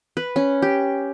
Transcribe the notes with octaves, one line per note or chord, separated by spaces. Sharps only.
B4
C#4
G4